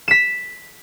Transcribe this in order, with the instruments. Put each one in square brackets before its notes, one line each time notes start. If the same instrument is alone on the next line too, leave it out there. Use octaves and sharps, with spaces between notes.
[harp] B6 E7